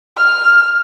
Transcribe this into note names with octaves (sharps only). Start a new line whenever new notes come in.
F6